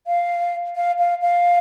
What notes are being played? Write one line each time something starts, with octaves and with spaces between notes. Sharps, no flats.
F5
F5
F5
F5